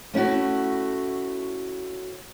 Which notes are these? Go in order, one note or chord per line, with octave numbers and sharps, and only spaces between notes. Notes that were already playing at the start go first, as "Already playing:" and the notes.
A3 C#4 E4 F#4